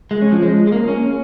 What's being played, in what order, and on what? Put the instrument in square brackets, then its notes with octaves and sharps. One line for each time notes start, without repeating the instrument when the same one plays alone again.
[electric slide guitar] G#3
C#4
F3
G#3
G#3
A#3
C#4